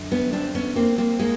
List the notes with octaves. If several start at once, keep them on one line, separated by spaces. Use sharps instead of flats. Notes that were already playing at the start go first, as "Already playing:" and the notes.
Already playing: F#2 D3
B3 C#4
C4 D4
B3 C#4
A#3 C4
A#3 C4
G#3 A#3